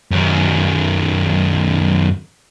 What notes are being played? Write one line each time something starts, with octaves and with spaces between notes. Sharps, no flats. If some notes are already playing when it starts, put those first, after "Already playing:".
F#2 D#3